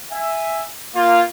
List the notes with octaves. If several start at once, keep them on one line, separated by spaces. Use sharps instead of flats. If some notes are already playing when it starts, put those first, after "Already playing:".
E5 G#5
A#3 F4